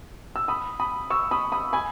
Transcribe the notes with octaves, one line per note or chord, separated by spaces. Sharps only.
E6
B5 D#6
B5 D#6
C#6 E6
B5 D#6
B5 D#6
G#5 B5